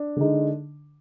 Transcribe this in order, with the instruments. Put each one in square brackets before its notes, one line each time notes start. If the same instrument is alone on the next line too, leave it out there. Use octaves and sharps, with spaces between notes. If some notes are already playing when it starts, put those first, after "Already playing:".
Already playing: [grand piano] D4
[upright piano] D3 G#3 D#4